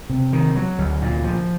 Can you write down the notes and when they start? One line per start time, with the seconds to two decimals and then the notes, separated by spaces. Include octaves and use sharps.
0.10 C3
0.33 D#3
0.56 F#3
0.78 D2
1.02 A#2
1.24 F3